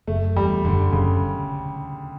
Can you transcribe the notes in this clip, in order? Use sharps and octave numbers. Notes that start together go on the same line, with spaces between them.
F#1 A3
E2 G3
F#1 D3
F#1 C#3